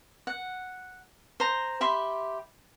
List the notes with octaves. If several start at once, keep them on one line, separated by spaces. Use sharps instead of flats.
F#5
C5 A#5
G4 E5 B5 C6